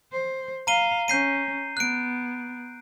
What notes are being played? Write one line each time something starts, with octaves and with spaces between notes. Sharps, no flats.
C5
F5 A#5 D#7 G7
C#4 G6 C7 D#7
B3 F#6 D7